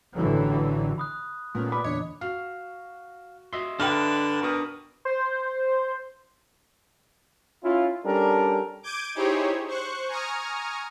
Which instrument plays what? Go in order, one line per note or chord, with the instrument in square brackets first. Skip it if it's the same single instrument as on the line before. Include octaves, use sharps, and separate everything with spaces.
[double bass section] A1 A2 D3 E3 F#3
[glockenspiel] B5 D#6 F#6
[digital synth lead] A#2 [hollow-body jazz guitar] A3 B3 C#4
[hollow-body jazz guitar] B4 D5 [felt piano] B5 [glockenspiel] D6
[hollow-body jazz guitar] E2 A#2 [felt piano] D3 D#5 [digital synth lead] C#5
[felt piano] F#4 [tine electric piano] F5
[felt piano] F#4 [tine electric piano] D#5 E5 C6
[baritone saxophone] D3 [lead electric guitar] D4 B4 [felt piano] G5 F6
[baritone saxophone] B2 [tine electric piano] A#4 C#6 D#6
[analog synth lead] C5
[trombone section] C#4 E4 F4
G3 C#4 D4 A4 A#4
[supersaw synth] D6 G6 G#6 D7 D#7
D#4 E4 G4 G#4 C5 C#5
C5 C#6 F#6
G#5 A#5 C#6 D#6 F6